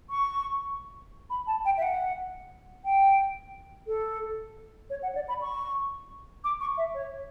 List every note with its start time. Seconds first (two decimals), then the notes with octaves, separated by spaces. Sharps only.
0.10 C#6
1.30 B5
1.47 A5
1.65 G5
1.77 E5
1.82 F#5
2.85 G5
3.87 A4
4.90 C#5
5.03 F#5
5.15 D5
5.28 B5
5.42 C#6
6.44 D6
6.61 C#6
6.77 E5
6.95 C#5